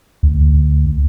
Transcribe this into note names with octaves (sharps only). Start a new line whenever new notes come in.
D2